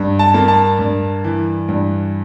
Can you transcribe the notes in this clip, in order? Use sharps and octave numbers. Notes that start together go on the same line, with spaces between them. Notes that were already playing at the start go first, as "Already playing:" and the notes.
Already playing: G2
A5
A#3
A5
G2
E3
G2